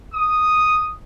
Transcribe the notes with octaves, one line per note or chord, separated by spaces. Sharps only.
D#6